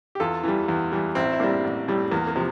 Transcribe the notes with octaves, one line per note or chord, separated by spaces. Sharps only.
G4
E2 F4 A4
E3 G3
E2
E3 G3
A1 C4 E4
E4
A2 G3 A#3 D4
A1
A2 G3
E2 A#3
A#3
C3 F3